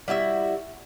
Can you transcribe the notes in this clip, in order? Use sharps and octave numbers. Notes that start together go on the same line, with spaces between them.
G3 E4 F#4 E5